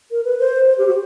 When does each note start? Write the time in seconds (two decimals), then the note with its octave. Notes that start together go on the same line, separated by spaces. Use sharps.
0.11 A#4
0.25 B4
0.40 C5
0.68 C5
0.78 G4
0.88 F#4